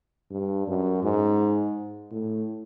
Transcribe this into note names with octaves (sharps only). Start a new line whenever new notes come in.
G2
F#2
G#2
A2